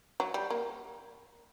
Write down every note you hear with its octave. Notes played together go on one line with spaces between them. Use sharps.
F#3
G3
A#3